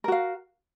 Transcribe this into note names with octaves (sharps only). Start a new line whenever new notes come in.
F#4 A#4 F5